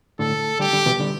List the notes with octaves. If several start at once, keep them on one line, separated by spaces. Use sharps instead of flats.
A2 D3 A4
D3 G3 G4
D3 G3
B2 E3
D3 G3